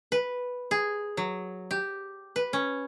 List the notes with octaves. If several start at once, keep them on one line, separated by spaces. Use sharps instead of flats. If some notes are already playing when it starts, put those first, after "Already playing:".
B4
G#4
F#3
G4
B4
C#4